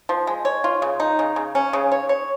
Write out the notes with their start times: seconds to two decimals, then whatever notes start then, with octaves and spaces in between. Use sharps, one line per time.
0.09 F3
0.27 G#3
0.45 C#5
0.64 F4
0.82 C#3
1.00 D#4
1.19 C#3
1.36 C#3
1.55 C#4
1.73 C#3
1.92 C#5
2.09 C#5